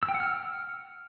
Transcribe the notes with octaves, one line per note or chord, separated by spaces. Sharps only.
E6
G5
F#5
F6